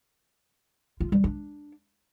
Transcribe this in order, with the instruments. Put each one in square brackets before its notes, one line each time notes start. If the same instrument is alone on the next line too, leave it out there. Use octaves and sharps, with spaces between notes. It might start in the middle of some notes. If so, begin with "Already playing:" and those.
[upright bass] F4
G3
D4